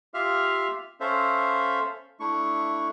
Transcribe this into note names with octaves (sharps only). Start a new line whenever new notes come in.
F4 G4 E5 F5 F6
C#4 A4 C5 E5 F5
A3 D4 E4 C#6